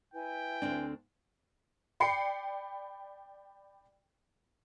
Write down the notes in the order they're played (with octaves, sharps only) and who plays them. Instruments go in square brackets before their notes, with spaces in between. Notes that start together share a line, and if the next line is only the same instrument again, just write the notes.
[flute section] E4 B4 G#5 [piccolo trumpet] G5
[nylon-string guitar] D2 C4 D4
[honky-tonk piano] D5 G5 B5 C7 C#7